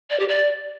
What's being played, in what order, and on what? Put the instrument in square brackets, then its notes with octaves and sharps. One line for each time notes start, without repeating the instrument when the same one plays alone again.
[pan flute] D5
G4
D5